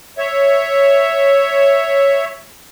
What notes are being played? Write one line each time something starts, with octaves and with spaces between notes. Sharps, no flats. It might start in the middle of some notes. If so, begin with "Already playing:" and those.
C#5 E5